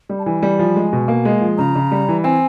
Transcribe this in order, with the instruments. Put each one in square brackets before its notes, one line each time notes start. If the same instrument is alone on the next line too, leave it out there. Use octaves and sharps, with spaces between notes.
[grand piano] G3
[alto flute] A5
[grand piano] E3 [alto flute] G#5
[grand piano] G3
F3
G#3
B2
A#3
G#3
F3
[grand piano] C#3 [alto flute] A#5
[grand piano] C#3
G3
E3
[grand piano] C4 [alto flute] G#5